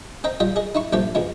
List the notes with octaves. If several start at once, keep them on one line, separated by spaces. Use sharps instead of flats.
C4 D#5 G5 A#5
G3 F4 D#5 G5
G#4 D#5
D#4 E4 C#6
A#1 G2 A3 C4 G4 G5
F2 B2 G#3 B3